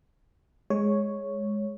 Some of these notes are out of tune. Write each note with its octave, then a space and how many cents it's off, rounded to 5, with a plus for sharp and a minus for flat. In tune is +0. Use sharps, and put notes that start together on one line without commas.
G#3 +0 C#5 +0